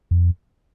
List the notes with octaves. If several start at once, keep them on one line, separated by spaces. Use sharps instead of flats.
F2